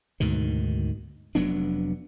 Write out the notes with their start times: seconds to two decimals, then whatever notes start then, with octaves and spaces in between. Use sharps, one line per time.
0.20 D2 G#2 B2 D#3
1.35 F1 F#3 B3 D4